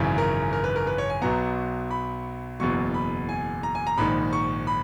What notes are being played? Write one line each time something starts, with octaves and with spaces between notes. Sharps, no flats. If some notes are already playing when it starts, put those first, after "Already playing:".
Already playing: G#1 F#2 C#3 E3
A#4
A#4
B4
A#4
B4
C#5
G#5
B1 B2 F#3 B3 A#5
B5
F#1 E2 B2 F#3 C#6
B5
G#5
A#5
G#5
A#5
A#1 G#2 D#3 B5
C#6
B5